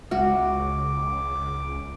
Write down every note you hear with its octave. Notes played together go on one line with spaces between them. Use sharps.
C#2 G#3 F#4 D6